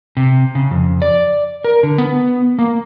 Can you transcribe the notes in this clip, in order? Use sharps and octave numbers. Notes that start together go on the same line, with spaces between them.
C3
C#3
F2
D5
A#4
D3
B3
A#3